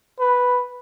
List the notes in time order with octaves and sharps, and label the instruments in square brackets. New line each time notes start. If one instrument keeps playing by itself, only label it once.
[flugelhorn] B4